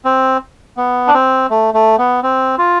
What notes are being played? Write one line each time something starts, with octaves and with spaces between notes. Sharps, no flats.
C4
B3
D4
C4
A3
A3
B3
C4
F4